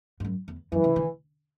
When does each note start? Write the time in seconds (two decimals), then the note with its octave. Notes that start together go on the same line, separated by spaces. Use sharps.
0.20 G#2
0.25 F#2
0.48 E2
0.72 F#2 E3
0.84 C#3
0.96 D#3